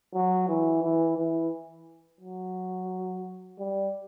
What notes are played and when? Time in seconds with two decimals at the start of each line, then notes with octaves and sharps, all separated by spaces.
0.14 F#3
0.48 E3
0.83 E3
1.17 E3
2.21 F#3
3.59 G3